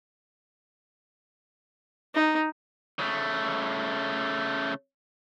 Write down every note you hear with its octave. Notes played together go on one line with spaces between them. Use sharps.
D#4
C#3 A3